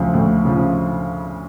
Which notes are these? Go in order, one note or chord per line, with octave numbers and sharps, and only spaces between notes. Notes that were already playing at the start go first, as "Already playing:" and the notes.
Already playing: D2 C#3 F3
D2
C#3 F3